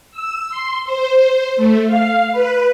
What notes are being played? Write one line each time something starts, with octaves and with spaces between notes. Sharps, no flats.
E6
C6
C5
A3
F5
B4